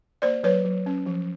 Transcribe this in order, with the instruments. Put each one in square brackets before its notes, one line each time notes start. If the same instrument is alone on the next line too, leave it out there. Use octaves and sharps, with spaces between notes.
[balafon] A#3 C5 D5
F#3 B4 C#5
F#3
C#4
F3